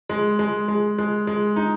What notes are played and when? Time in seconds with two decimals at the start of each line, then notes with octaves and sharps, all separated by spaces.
0.09 G#3
0.39 G#3
0.68 G#3
0.98 G#3
1.27 G#3
1.56 D#4